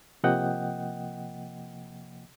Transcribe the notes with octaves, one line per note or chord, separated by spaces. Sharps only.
C3 F3 A#3 D#5 F#5 G5